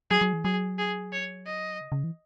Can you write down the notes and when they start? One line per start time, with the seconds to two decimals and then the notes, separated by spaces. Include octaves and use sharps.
0.11 F#3 G#4
0.21 F#3
0.33 E3
0.45 F#3 G#4
0.79 G#4
1.13 C#5
1.46 D#5
1.81 C#3
1.92 C#3
2.04 E3